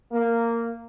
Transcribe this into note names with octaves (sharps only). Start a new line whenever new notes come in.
A#3